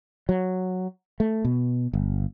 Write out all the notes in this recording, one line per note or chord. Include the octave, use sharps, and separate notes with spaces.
F#3
A3
B2
G1